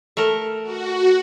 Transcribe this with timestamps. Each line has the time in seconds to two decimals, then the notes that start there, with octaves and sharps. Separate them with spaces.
0.17 A3 A#4
0.62 F#4